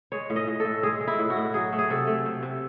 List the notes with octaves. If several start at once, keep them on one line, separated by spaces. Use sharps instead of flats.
G#3 C#5
A2
D#5
A2
A4
A2
G#3 G#4
G#3
E4
A2
F#4
A2
F#3 G#4
A3
G#4
C3 A4
A3
C3
C3